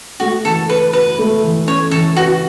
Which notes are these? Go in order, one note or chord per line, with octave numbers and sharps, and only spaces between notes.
A3 F#4
E3 A4
A4 B4
F#4 B4
A3
E3
C#4 C#5
E3 A4
F#4 B4